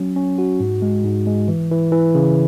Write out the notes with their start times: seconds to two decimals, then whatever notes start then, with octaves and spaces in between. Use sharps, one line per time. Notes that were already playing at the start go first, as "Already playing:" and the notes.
Already playing: F#3 C#4
0.16 C#4
0.38 F#4
0.60 G#2
0.82 G#3
1.04 G#2
1.27 G#3
1.48 E3
1.71 E3
1.92 E3
2.15 C#3